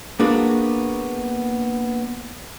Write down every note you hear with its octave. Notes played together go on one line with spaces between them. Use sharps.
A#3 B3 D4 F#4 G#4 A#4